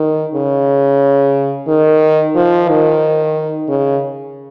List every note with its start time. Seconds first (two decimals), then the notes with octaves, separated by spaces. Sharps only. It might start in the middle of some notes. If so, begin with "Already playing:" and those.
Already playing: D#3
0.34 C#3
1.68 D#3
2.35 F3
2.68 D#3
3.68 C#3